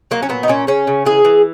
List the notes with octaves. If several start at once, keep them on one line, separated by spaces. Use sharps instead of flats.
F#3 A#3
C#4
A#2 B3
D#4
A#2 C#4
C#3 C#4
C#3
E3 G#4
E3